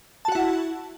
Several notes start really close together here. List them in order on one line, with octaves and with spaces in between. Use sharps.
A5 F#4 F#5 E4